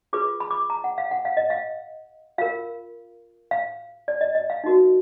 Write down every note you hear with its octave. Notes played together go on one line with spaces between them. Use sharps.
F4 G#4 B4 D6
B5
D6
A#5
F#5
F5
F#5
F5
D#5
F5
F4 A#4 F5
F5
D5
D#5
D#5
F5
D#4 F#4 A#4